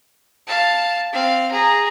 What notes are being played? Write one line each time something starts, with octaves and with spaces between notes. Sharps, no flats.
F5 A5
C4 F5
G#4 A#5